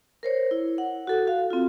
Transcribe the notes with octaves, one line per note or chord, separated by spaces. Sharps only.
A#4 C5 C#5
E4
F#5
F#4 A4
F#4 F5
C4 F4